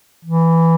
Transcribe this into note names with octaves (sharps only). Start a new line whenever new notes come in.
E3